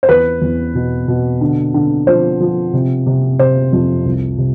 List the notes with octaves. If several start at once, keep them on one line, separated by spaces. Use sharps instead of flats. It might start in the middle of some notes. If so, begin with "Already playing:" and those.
C5
E2 B4
E2
B2
B2
D3
D3
F3 C5
F3
C3
C3
C3 C5
F2
C2
C3